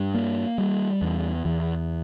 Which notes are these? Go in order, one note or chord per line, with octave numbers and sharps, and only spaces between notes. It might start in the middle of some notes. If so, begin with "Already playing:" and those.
Already playing: G2
A#3
G3
E2
E2